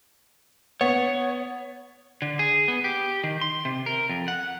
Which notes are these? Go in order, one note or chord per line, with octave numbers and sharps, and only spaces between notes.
B3 C#5
D3
G#4
B3
G4
D#3
C6
C3
A#4
F2
F#5